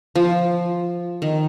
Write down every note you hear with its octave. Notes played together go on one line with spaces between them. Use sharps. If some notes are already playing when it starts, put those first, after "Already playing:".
F3
D#3